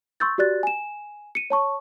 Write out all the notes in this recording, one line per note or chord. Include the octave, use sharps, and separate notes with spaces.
C6 C#6 E6 G6 A6
F#4 G4 D5 F#6 A6
G#5 E7
C#7 D#7
C#5 A5 C#6